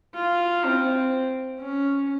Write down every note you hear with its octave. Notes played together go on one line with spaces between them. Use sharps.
F4
C4
C#4